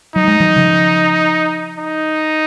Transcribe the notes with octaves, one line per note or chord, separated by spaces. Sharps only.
F#3 D#4
G#3
D#3 F#3
C#3 F3
D#4